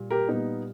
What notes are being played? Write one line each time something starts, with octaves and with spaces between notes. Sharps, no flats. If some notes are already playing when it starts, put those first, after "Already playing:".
Already playing: A#2 G3
G4 A#4
A#2 G3 B3 D#4